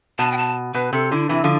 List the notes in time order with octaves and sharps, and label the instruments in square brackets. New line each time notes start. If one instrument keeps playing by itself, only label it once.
[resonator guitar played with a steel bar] B2 [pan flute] A5
[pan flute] G5
A5
[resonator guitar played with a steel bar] B2 [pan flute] B4
[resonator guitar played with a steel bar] C3 [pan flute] A4
[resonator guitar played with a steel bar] D3 [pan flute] E4
[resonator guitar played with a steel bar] C3 E3 [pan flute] E4
[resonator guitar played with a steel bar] D3 F3